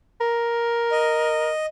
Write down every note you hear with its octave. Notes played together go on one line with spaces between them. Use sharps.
A#4
D#5